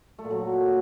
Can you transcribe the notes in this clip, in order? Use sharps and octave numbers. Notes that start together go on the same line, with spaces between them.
A3
A#2
F#3